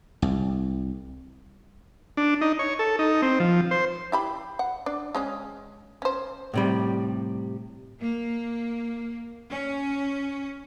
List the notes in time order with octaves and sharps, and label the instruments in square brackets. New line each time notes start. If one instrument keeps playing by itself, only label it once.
[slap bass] C2
[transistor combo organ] D4
D#4
C#5
A4
D#4
C4
F3
C5
[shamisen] E4 G4 B5
F#5
D4 D5
G#3 C#4 G#4
C#4 C5
[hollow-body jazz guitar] A2 C3 G3
[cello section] A#3
C#4